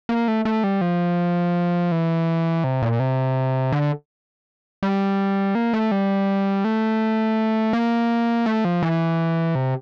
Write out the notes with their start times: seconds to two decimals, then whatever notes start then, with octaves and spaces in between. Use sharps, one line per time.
0.09 A#3
0.28 A3
0.45 A3
0.64 G3
0.81 F3
1.92 E3
2.64 C3
2.82 A#2
3.00 C3
3.72 D3
4.83 G3
5.55 A#3
5.73 A3
5.92 G3
6.65 A3
7.73 A#3
8.46 A3
8.65 F3
8.83 E3
9.55 C3